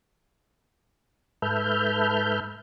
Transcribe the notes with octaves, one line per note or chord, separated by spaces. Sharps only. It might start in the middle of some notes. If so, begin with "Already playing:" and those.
G#2 A4 B4 E5 F6 G6